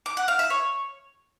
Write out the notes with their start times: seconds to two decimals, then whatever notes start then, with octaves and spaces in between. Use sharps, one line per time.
0.06 D6
0.17 F#5
0.28 F5
0.39 E5
0.50 C#5